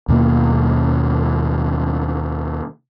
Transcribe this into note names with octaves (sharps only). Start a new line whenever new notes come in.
D#2 B2 A#3